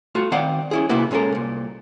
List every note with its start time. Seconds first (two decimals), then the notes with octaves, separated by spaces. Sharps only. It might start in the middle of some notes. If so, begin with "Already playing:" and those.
0.15 A3 F4 F#4
0.32 D#3 C4 C5 D5 F5 F#5
0.71 C#4 E4 G#4
0.89 C3 A#3 B3 E4 F#4
1.11 A#2 G#3 C#4 A4 A#4
1.32 C2 A#2